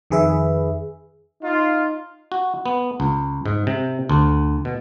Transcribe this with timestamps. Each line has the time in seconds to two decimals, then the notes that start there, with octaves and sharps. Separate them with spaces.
0.10 F2 D#3 G#4 B4 E5
1.42 D#4 F4
2.32 F#4
2.66 B3
3.00 C#2
3.46 G#2
3.67 C3
4.09 D2
4.65 B2